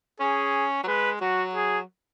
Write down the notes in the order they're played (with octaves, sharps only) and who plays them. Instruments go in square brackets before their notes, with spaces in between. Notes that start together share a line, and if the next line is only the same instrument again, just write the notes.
[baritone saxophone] C#4 [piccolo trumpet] G#4
[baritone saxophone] F#3
[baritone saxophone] G#3 [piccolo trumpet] B4
[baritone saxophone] F#3 [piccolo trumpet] F#4
[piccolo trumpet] G#4